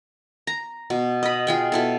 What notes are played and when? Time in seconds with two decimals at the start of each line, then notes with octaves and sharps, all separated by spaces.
0.47 A#5
0.90 B2
1.23 D#5 B5
1.47 F4 G#4 G5
1.72 B2 E4 A4